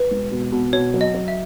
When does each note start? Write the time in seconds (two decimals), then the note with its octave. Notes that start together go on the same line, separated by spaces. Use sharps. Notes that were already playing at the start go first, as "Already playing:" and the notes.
Already playing: B4
0.11 E1
0.31 B2
0.52 B2
0.73 B2 C#5
0.94 F#3
1.01 D#5
1.14 F#3
1.28 E5